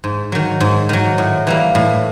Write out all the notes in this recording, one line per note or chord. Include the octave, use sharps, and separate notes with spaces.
G#2
D#3 F#3
G#2
D#3 F#3
A2
E3 G3 A#3
A2